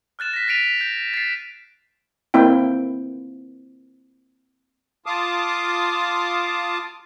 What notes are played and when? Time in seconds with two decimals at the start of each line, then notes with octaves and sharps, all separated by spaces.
0.19 F6 F#6 A6 E7
0.33 A#6 B6
0.48 A6 B6 C7 D7 D#7 F7
0.81 G6
1.14 A6 C7
2.34 A#3 C4 E4 G5
5.06 F4 F5 A5 D6 D#6